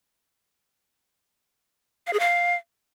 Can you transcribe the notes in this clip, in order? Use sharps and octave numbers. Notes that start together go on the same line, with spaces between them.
F5
G#4
F5